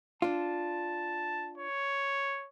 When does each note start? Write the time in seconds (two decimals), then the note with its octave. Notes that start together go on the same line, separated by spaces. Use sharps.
0.22 D4 F4 A5
1.58 C#5